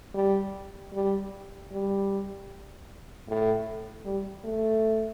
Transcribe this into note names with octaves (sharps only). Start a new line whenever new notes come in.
G3
G3
G3
A2
G3
A3